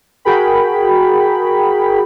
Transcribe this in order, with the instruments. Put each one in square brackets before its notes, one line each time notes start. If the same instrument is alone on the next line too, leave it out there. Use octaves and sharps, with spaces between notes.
[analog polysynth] F#4 G#4 A#4 G5 B5